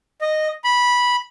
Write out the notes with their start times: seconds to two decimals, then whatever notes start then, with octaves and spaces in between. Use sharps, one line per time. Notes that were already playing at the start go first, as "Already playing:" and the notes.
0.21 D#5
0.64 B5